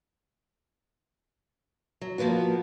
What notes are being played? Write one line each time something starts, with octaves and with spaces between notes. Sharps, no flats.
F#3
F3 A#3 B3 F#4